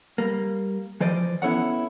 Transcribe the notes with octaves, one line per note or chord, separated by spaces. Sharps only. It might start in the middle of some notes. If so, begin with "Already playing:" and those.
G3 A#3
E3 F3 C5 D5 D#5
B3 C#4 E4 A4 C#5 F#5